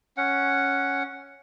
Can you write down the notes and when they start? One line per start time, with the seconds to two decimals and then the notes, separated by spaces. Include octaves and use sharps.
0.17 C#4 F#5